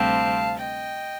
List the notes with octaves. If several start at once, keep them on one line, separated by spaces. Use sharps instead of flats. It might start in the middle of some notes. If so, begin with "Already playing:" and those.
Already playing: D2 C3 G3 C4 F5 A5
D#5 G5